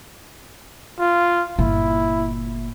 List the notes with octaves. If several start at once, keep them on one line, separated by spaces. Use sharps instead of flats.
F4
G1 A#2 E4